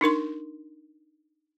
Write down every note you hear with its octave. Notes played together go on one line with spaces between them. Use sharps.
D4 D#4 A#4 C6